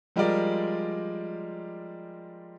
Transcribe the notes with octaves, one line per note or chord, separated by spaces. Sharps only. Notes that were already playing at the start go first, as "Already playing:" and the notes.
F3 G3 G#3 F4 A#4 D5